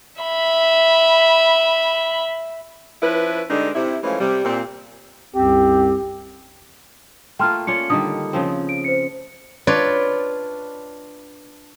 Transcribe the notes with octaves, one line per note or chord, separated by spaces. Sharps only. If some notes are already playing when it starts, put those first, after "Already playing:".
E5 B5
F3 C#4 E4 B4
D3 G3 G#3 D4 D#4
C3 E4
E3 F3 G#3 A3 C#4
C3 G3
A#2 C4
C2 F#2 C4 G4
A3 A#3 F4 G5 C6 F6
C#4 F4 D5 C#7
D3 D#3 G3 D#6
C#3 F3 C4
D7
C5 C#7
D4 F4 B4 C#5 D5